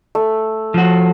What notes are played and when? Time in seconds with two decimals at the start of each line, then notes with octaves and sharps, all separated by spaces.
0.15 A3
0.74 F3 F#4